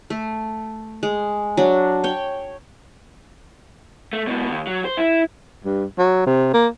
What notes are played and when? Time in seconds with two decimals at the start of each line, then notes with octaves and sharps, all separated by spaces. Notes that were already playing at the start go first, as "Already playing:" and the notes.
0.10 A3
1.03 G#3
1.57 F#3 D4
2.04 C#5 G5
4.13 A3
4.27 G#2 B2
4.49 D#2
4.67 F#3
4.85 C5
4.97 E4
5.65 G2
5.98 F#3
6.26 C3
6.54 A#3